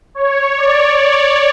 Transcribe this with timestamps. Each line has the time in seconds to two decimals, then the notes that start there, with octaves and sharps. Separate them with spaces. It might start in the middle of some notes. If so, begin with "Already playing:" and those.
0.15 C#5
0.57 D5
0.99 C#5